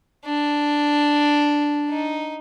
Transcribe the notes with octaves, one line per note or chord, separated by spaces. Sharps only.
D4
D#4